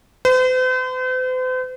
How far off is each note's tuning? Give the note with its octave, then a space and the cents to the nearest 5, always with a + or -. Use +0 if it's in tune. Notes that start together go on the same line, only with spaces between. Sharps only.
C5 -45